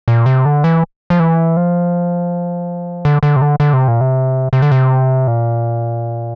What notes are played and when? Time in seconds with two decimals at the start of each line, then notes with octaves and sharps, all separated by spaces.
0.08 A#2
0.26 C3
0.45 D3
0.64 E3
1.10 F3
1.20 E3
1.57 F3
3.05 D3
3.23 D3
3.36 C3
3.42 D3
3.60 D3
3.73 C3
3.88 A#2
4.01 C3
4.53 C3
4.62 D3
4.72 C3
5.27 A#2